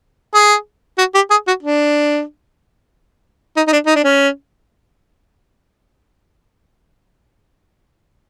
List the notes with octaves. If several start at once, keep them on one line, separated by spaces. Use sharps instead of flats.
G#4
F#4
G4
G#4
F#4
D4
D#4
D#4
D4
D#4
D4
C#4